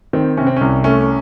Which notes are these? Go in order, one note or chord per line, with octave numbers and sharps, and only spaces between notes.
D#3 C4
C3 C#4
C4
C2 C#4
A3 C#4